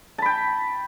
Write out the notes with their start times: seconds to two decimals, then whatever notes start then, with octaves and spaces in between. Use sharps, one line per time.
0.18 A5
0.22 B5
0.26 G5